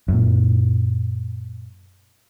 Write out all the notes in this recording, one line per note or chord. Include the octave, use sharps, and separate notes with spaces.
F#2 A#2